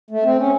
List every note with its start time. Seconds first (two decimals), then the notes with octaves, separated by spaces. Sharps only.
0.11 A3
0.23 C4
0.38 C#4